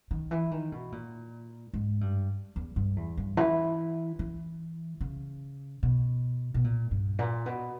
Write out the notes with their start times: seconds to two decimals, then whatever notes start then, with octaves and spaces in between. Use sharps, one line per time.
0.11 D#3
0.31 E3
0.51 D#3
0.72 B2
0.92 A#2
1.73 G#2
2.01 G2
2.56 E2
2.76 G2
2.96 E2
3.17 G2
3.37 E3
4.19 E3
5.01 C#3
5.83 B2
6.54 B2
6.64 A#2
6.91 G2
7.19 A#2
7.46 B2